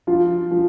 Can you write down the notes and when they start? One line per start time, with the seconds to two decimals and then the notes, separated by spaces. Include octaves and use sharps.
0.07 F3 F4
0.51 F3